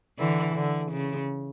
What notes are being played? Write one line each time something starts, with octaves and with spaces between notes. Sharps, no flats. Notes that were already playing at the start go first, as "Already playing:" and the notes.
D3 E3
D3
C#3